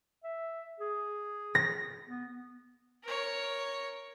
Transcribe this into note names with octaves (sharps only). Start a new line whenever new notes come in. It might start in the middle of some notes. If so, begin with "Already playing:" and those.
E5
G#4
A#6
B3
A#4 C#5